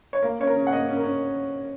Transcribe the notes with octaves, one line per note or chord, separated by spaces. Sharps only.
C#5
A#3 A#4
C#4 C#5
A#4
C#3
F#5
A#3 D#5
C#4
A#4
C#4